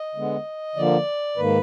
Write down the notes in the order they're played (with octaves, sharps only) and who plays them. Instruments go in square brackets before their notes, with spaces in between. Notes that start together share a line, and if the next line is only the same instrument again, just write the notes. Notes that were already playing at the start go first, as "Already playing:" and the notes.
Already playing: [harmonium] D#5
D3 G#3 B3
D3 F3 A#3 D5
G#2 D#3 A#3 B4